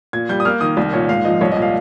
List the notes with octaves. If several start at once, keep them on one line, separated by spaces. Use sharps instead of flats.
A#2 G#6
G3 G6
D#6
A#3 F6
D#3 D#6
C2
A#2 C#5
G#2 F5
F3 D#5
C2 C#5
D#5
A#2
F5